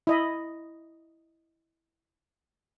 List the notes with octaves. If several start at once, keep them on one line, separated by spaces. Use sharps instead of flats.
E4 D#5 B5